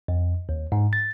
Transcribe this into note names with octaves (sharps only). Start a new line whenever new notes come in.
F2
D#2
G#2
A6